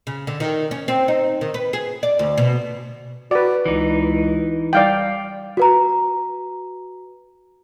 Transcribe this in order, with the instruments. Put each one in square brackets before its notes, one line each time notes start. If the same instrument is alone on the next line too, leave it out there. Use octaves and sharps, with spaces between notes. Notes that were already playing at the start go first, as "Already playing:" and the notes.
[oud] C#3
D3
D#3
C#4
C4
D#4
D#3
B4
G#4
D5
D2
B2
[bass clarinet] F#4 [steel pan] B4 D5
[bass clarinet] C#2 [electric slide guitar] E3 D#4
[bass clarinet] G3 [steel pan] D5 F5 G5
[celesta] F#4 B4 A#5